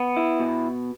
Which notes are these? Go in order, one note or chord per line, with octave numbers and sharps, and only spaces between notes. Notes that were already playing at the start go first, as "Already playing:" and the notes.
Already playing: B3
E4
B2